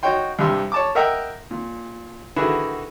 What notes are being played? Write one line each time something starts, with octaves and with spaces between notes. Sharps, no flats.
D#4 F#4 C#5 G5 C6
C2 G2 G4 E5 C6
C#5 A5 D6
A#4 D#5 E5 F#5 G5 A#5
A#2
D3 D#3 E4 F#4 G#4 B4